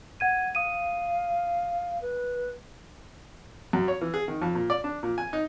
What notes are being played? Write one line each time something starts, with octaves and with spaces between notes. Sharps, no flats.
F#5 G#6 D#7
F5 D#6 D#7
B4
F#2
C#5
E3
G#4
D#3
F2
A#2
D5
D4
A#2
G#5
D#4